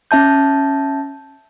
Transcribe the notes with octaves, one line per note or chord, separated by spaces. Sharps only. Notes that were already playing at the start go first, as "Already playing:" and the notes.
C#4 E5 A5 G6